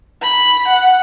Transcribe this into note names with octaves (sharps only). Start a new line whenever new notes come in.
B5
F#5